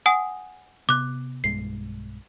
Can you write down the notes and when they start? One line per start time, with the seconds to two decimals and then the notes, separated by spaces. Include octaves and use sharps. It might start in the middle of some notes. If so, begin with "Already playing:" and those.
0.06 F#5 G#5 D#6
0.89 C3 B3 D6 F#6
1.44 B1 G2 G#3 C7